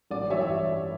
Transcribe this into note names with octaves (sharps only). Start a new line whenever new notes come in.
A1 D5
G2 E3 C#5 E5
E5